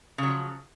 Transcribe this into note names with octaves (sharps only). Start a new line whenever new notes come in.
C#3 F3 F#3